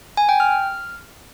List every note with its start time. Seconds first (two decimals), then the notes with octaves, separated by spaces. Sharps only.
0.17 G#5
0.29 G5
0.40 F6